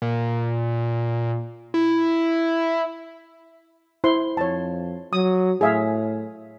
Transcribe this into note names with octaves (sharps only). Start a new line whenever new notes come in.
A#2
E4
E4 C5 C6
F2 C#5 A5
F#3 D#6
A2 G#4 E5 F5